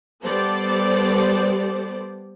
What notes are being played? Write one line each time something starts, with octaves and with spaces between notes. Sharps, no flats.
G3 B3 G4 A4 C5 D5